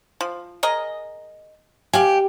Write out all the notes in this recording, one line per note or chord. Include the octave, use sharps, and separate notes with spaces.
F3
G#4 A#4 D#5
G4 D5 F5 G#5